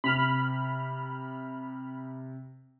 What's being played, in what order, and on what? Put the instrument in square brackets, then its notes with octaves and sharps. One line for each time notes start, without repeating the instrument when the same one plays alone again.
[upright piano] C3 [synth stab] B5 F6